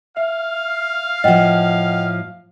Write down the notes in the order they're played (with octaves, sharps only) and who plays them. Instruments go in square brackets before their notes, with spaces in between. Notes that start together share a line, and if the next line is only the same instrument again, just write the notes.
[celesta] E5 [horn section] F5
[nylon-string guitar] A2 F3 [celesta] D#5 F#5 G5